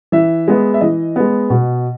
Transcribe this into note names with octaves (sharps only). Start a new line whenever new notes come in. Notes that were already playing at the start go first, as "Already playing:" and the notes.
E3 E5
G#3 B3
E5
E3 D#5
G#3 B3
B2